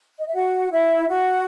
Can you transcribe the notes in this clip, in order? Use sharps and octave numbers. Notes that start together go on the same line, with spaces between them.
D#5
E5
F#4 F#5
E4 E5
F#4 F#5